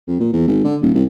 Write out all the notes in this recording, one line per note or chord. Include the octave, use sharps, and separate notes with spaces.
F2
A#2
E2
G#1
D3
D#1
C2